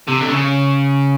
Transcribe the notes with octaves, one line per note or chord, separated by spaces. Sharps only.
C3
D3
C#3